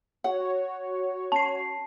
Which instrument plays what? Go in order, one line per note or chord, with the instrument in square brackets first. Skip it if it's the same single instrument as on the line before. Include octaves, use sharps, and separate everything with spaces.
[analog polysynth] F#4 C#5 [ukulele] F#5
[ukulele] C#4 [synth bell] A5 C7